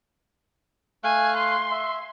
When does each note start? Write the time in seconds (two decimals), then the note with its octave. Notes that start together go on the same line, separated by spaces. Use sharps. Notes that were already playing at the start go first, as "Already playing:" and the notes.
1.04 A3 F5 G#5 F#6
1.36 C6
1.71 E5